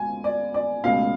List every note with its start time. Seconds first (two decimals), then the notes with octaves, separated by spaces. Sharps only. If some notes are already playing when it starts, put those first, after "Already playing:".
Already playing: C#2 B2 G#5
0.24 D5
0.54 D5
0.84 C#2 B2 A3 F5